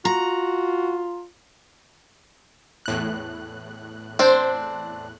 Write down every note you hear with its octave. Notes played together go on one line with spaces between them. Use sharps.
F4 F#4 A#5
E2 A2 F#6
C4 D4 C5